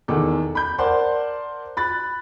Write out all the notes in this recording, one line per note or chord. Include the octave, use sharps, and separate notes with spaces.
E2 D#3 A4 D6
B5 G6
A#4 C5 D5 F#5 A5 C6
B5 F#6 A6